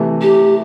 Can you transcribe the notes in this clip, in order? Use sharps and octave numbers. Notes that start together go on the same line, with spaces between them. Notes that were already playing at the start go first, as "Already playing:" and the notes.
Already playing: C3 E3 A3
G4